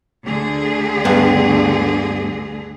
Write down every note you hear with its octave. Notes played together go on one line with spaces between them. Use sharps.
D2 D3 G#4
G2 B3